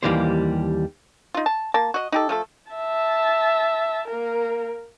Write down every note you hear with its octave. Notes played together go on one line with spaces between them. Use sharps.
D#2 C#3 E3 G3 A#3 C5
D#4 F4
A5
A#3 A5
F#4 D#5
D#4 G4 A4
F3 A3 A4
E5 A5
A#3 A#4